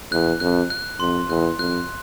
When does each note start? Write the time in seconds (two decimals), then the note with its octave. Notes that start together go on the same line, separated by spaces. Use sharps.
0.12 E2 F#6
0.40 F2 F#6
0.70 F#6
1.00 F2 C6
1.29 E2 F#6
1.58 F2 F#6